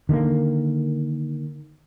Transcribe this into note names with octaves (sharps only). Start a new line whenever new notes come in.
D3 D#3 G3 A#3